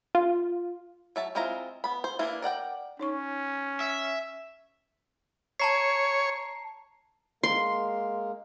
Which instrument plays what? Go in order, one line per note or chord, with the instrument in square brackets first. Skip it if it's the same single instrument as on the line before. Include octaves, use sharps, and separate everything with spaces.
[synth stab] F4
[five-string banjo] F#3 E5 A5
G#3 C4 E4 F4 A#5
B3 B5
C5
E3 A#3 D4 E4
A#4 D5 F#5 G5
[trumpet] C#4 [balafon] D#4 C#5 C#6
[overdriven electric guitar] E5
[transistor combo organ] C#5 [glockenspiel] A5 A#5 C7
[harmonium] G#3 A#3 A#4 [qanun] C6